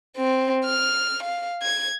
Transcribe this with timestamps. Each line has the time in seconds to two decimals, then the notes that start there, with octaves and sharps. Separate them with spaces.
0.17 C4
0.65 F6
1.23 F5
1.63 G#6